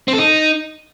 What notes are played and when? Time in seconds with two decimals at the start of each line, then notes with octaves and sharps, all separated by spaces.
0.08 C4
0.13 A4
0.18 D#4